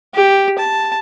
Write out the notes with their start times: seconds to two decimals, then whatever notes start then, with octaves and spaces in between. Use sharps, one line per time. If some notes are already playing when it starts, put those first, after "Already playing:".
0.15 G4
0.59 A5